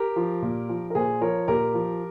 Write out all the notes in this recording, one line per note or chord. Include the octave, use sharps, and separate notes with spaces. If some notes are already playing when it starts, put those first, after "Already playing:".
Already playing: G4 A#4
F3
A#2
F3
A#4
A#2 G#4 C5
F3 A#4 C#5
A#2 G4 A#4
F3